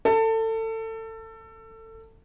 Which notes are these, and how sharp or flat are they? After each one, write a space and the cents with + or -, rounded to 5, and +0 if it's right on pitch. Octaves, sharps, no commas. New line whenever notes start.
A4 +25